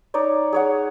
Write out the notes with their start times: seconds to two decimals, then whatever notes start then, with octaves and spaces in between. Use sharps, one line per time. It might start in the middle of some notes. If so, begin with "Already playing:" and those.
0.14 D#4 C#5 D5
0.53 G#4 C#5 F#5